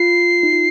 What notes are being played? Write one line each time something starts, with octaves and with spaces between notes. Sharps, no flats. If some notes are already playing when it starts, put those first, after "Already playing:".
Already playing: F4 C7
D#4
F4